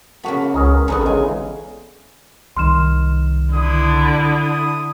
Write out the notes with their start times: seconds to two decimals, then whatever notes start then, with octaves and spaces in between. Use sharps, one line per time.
0.23 C#3 A#3 B3 F#4 A5
0.54 C#2 C#4 G#4 A#4
0.88 A1 E2 D3 F#4 G#4 A#4 B4
1.06 C#3 E3 G#3 G#5
2.57 C2 D#3 C6 F6 E7
3.53 D3 E4 D#6
4.23 D#6